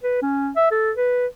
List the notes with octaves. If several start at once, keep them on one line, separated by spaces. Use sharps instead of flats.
B4
C#4
E5
A4
B4